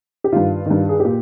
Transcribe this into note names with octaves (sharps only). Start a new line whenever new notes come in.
G4
G2 D#3 F4
G2 D#3
G#4
A#2 G4